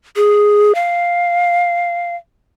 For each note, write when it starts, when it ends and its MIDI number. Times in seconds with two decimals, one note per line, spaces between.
0.16 0.75 68
0.75 2.16 77